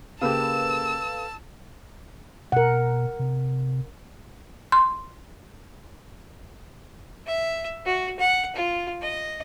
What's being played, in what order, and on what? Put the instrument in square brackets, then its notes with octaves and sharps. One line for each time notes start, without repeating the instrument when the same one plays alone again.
[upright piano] C#3 A#3 G4 [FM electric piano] A4 B4 F5 [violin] A5 [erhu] E6
[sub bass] B2 [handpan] A#4 F#5
[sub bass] C3
[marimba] C6
[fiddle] E5
F#4
F#5
F4
D#5